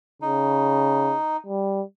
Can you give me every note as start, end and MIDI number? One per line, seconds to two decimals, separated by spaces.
0.22 1.14 49
0.22 1.37 63
1.46 1.82 55